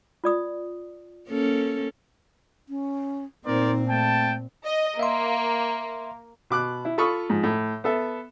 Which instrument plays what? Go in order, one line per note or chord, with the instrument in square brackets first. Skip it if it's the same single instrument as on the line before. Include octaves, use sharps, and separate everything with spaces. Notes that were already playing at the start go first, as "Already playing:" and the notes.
[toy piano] F4 D5 D#6
[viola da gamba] A#3 C#4 A4
[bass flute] C#4
[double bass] A#2 C4 [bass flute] D#4 [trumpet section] A#4 C5 D5
[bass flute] A3 [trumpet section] G5 A5
[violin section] D#5
[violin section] A#3 [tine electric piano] E5 F5 C6
[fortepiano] B2 D6 F#6
E4
F4 A4 B5 C#6 D#6 F6
G#2 F3
A2
B3 A4 E5